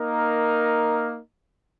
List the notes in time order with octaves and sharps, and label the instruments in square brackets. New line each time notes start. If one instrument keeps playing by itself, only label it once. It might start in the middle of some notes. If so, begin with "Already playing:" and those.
Already playing: [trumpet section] A#3 D#4 A#4